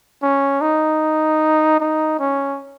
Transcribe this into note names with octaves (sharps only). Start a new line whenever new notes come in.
C#4
D#4
D#4
C#4